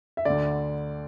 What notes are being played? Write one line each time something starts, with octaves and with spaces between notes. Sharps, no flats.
E5
D2 D3 D5